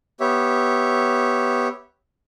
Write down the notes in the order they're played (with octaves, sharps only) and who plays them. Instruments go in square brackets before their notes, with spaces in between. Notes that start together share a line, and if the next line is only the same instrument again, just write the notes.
[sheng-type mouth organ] B3 G4 C#5 E5